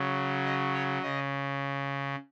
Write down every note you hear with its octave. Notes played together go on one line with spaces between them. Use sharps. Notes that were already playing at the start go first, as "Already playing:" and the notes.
Already playing: C#3 F#3
D#5
C#5
C#3 D#5